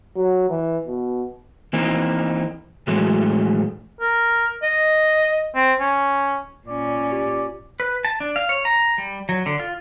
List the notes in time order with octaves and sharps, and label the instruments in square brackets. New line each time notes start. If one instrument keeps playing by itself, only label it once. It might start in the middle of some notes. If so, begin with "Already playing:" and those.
[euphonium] F#3
E3
B2
[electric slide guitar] E3 A#3 C4 D#4
A2 E3 F#3 G#3 A3
[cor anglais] A#4
D#5
C4
C#4
[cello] A#2 C#4 [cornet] D5
[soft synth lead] G4
[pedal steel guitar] B4
A5
D4
F5
C#5
A#5
G3
F#3
D3
F4